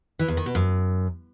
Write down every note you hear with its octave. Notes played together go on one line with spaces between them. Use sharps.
E3
E2
D#3
B2
F#2